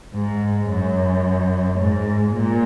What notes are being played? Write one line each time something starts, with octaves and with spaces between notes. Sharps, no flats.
G#2
F#2
G#2
A#2